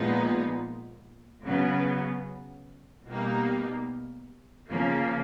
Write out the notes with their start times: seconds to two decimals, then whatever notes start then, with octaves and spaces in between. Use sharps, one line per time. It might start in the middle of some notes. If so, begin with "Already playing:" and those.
Already playing: A#2 F3 G#3 B3 D#4
1.45 C#3 F#3 B3
3.07 B2 G3 A#3 D#4
4.69 C#3 F3 A#3